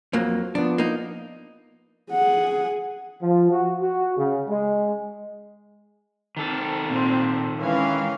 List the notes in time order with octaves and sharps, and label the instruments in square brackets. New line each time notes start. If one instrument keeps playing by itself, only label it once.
[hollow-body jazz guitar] F2 F#3 A#3
[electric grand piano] F3 B3 [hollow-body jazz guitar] D4
[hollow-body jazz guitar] A#3 D#4
[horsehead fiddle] G#4 F#5
[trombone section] F3
F#4
F#4
C#3
G#3
[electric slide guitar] D#3 A4 [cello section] C4
[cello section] A#2 [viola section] C4
[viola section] E3 [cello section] G#3 C#4 F5